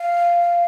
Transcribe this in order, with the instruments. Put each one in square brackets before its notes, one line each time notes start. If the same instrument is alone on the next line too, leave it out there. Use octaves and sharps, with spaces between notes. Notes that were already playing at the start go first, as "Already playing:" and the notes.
Already playing: [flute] F5